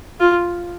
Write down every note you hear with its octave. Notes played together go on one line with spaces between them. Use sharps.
F4